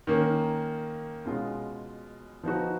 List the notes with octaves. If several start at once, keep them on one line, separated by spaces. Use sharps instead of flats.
D#3 A#3 C#4
B2 G#3 C#4 F4
F3 B3 D#4 F#4